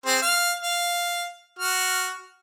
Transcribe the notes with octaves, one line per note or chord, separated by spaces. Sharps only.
C4 G#4 C5
F5 F6
F5
F#4 F6